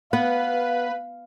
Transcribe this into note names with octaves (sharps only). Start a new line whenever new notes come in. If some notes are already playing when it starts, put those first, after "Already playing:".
B3 B4 F5